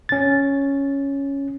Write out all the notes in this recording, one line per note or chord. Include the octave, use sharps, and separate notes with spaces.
C#4 A6